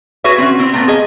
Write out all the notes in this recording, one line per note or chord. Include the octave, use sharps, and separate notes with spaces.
F#4 G#4 B4 C#5 E5
C4 C#4 F#4
B3 C4 E4
A#2 F#3 A3 B3 C4
G#4 D#5